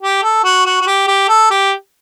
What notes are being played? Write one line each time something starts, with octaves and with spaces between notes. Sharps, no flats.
G4
A4
F#4
F#4
F#4
G4
G4
A4
G4